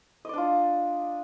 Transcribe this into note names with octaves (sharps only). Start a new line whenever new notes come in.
D4 F4 D5 D#5